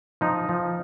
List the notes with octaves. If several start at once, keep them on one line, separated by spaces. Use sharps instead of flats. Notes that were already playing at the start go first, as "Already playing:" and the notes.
F3 D#4
F3